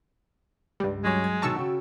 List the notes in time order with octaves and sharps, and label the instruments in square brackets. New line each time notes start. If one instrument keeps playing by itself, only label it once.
[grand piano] C#2 [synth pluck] G2 G3
[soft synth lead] F#3 [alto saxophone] G#3 [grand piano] C#4 F#4 C#5
[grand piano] G#6
[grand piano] B2 D#3 F#3 [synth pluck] A5 C#6 E6
[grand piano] C#3 G5 [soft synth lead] F#4